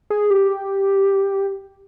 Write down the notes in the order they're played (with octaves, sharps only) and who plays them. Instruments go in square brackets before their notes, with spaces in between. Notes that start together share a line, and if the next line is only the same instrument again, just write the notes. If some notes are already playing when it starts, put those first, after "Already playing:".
[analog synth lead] G#4
G4